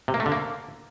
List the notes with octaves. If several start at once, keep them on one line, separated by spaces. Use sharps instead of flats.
C3
A#3
A3
D3
A#3